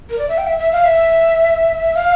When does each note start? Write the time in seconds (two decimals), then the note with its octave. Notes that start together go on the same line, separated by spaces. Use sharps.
0.10 A#4
0.18 D5
0.29 E5
0.38 G5
0.47 E5
0.59 E5
0.72 F5
0.84 E5
1.96 F5